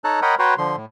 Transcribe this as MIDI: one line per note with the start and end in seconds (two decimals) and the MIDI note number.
0.04 0.20 63
0.04 0.20 69
0.04 0.20 73
0.04 0.20 81
0.04 0.20 82
0.04 0.20 90
0.22 0.35 70
0.22 0.35 73
0.22 0.35 75
0.22 0.35 78
0.22 0.35 79
0.22 0.35 83
0.39 0.54 66
0.39 0.54 71
0.39 0.54 73
0.39 0.54 79
0.39 0.54 82
0.39 0.54 84
0.58 0.76 50
0.58 0.76 53
0.58 0.76 84
0.76 0.85 45